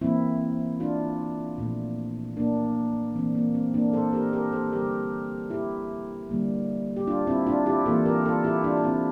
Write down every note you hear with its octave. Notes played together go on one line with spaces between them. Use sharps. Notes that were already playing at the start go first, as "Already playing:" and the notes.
E3 A#3 C4 E4
D4 F4
A#2 F3 A3
A#3 D4
E3 A#3 C4
A#3
C4
A#3 D4
A4 C5
G4 A#4
G4 A#4
A4 C5
D3 G3 A#3 G4 A#4
E4 G4
D3 G3 A#3
G4
D4 F4
C4 E4
D4 F4
E4 G4
E3 A#3 F4 A4
G4 A#4
F4 A4
E4 G4
D4 F4
F4
C4 E4